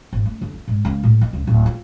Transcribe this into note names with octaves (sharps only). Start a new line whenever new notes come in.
G#1
A3
D3
F4
G#2
C#2
A2
D#3
C#2
D1
F4